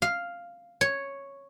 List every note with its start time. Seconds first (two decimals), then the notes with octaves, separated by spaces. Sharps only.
0.02 F5
0.81 C#5